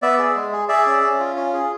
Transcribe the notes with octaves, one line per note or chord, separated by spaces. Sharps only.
B3 D5 E5
G#4
G#3
G#4
G#4 D5 E5
C#4
C#4
F4
C#4
G#4